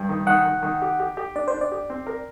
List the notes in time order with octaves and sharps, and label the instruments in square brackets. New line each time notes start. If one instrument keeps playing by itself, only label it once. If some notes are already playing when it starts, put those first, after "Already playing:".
Already playing: [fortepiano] G2
D#3
[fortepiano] D#3 [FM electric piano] F#5
[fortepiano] D#3
D#3
G4
G4
G4
[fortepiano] D4 [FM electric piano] D5
[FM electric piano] C5
[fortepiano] D4
[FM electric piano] D5
[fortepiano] G4
C4
A#4